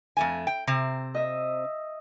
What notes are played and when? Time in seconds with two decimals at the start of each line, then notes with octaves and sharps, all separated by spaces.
0.17 F2 A3 G#5
0.47 G5
0.67 C3 C4
1.14 D#5 E5